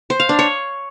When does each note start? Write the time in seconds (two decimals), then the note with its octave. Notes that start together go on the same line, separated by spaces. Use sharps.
0.10 C5
0.20 F5
0.29 D4
0.39 C#5